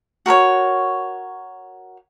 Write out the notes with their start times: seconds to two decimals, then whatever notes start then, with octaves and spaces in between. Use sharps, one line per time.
0.26 F#4 A#4 B4 C#5